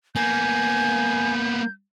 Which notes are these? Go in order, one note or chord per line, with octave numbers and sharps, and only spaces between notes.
A#3 B3 G#5 G6